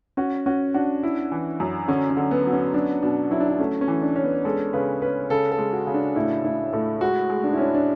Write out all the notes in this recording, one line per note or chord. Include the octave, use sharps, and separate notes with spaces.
C#4 F#4
C#4 F#4
D4 F#4
E4
E3
F#2
D3 C#4
C#4
D3
B3
F#3
C#4
F#3 D4
B2 D4
F#3 E4
D4
E4
A3 C#4
C#4
E3
D4
C#4
B3
G#3 A4
C#3 B4
C#4 B4
C#3 A4
A4
G#3
F#4
C#3
D4
A2 E4
A2 E4
A2 A4
G#3 F#4
G#3
D4
E4
C#4 D4
D4